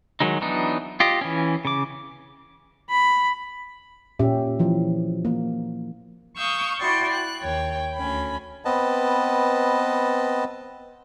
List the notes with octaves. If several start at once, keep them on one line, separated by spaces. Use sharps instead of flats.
D#3 F#3 G#3 D#4
E3 F#3 B3 D4 D#4
F4 G4 D#5
E3 C#4
C#3 D6
B5
A#2 C#4 G4 E5
E3 F3
A#3
F5 C#6 D#6 E6 G6
E4 F#4 D5 G5 C6 C#6
F#6
D#2 C#5 G5
D2 C#4 B5
B3 C4 B4 D#5 A5